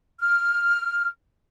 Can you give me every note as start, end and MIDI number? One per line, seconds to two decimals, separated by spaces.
0.20 1.06 89